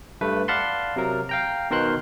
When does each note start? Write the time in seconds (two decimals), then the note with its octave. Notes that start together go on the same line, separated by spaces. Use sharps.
0.21 G2 A3 B4
0.48 D5 F5 F#5 A5 B5 C6
0.96 C3 F#3 A#4
1.29 F5 G5 A#5
1.70 B2 D#3 A#4 C5 C6 F#6